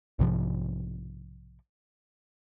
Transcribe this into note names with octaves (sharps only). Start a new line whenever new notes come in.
B1 G#2 C3 F3